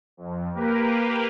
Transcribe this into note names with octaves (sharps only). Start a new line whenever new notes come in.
F2
A#3 G4 A#4 B4